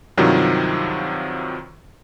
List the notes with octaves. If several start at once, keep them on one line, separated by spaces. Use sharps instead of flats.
G2 C3 D#3 F3 F#3